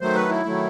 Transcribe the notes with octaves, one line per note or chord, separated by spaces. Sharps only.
D#3 F#3 A3 C5
B4
E4
D#3 F#3 A3